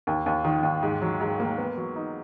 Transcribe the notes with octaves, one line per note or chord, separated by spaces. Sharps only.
D#2
D#2
D#3
D#2
G#2
F#3
G#2
A#3
B3
F#3
D#4